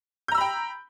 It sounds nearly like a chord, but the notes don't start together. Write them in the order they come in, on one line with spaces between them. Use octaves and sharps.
G6 A#5 E6 B5 G5